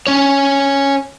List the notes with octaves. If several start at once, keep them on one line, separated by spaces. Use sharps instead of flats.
C#4 C#5